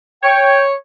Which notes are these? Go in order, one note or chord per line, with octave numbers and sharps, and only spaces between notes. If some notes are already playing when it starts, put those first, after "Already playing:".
C#5 G5